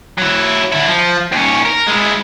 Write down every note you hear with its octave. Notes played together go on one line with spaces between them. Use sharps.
F#3 E4
D3 E4
F3
D#2 C#4
A#4
G#3 E4